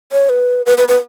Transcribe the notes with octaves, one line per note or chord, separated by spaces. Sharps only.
C#5
B4
B4
B4
B4